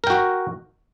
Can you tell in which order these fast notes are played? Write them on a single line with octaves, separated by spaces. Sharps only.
A#4 G5 F#4